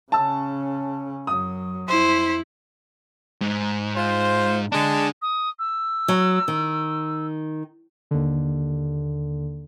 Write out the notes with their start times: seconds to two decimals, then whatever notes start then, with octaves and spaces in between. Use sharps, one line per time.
0.12 C#3 C#4 A5 E6
1.27 F#2 F#3 D#6
1.89 F2 E4 C5
3.41 G#2
3.95 F4 C5
4.72 D3 G#3 D4 A5
5.22 D#6
5.59 E6
6.08 F#3
6.48 D#3
8.11 D#2 D3